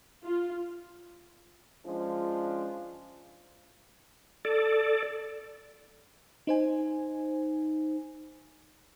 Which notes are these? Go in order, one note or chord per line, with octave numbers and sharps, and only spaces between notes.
F4
F3 G#3 C#4 D4 F4
A4 D5
D#4 C5 G#5